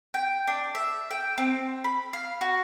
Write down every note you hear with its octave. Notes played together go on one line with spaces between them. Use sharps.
G5
D4
E5
G5
C4
B5
F5
F#4